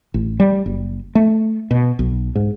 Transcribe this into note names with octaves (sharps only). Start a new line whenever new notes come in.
A1
G3
F#1
A3
B2
B1
G#2